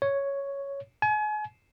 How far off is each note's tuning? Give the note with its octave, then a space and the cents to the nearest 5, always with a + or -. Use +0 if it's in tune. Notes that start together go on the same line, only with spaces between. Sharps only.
C#5 +0
G#5 +35